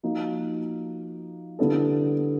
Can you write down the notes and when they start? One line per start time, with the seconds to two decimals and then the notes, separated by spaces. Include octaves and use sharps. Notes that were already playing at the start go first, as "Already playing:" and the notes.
0.03 F3 A#3 D#4 F#4
1.59 D3 G3 B3 E4 A4